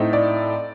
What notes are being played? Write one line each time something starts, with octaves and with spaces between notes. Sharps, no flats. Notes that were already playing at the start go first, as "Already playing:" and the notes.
Already playing: A2 A3 C4 D#4
D5